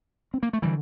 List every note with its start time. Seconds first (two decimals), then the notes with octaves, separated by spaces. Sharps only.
0.34 C4
0.43 A#3
0.53 A3
0.62 D3 E3 G3